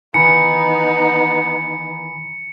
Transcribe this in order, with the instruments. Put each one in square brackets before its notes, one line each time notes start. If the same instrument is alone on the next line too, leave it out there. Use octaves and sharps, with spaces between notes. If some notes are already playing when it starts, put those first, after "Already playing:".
[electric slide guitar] D#3 E3 [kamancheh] B3 D#4 [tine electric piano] G#5 A#5 B5 [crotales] C#7